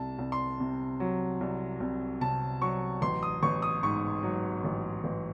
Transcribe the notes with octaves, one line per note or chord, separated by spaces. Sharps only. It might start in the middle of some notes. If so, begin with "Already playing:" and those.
Already playing: C2 A5
C2
C6
C3
F#3
C2
C2
C3 A5
F#3 C#6
A1 C6
D#6
A1 C#6
D#6
G#2 C#6
F#3
A1
A1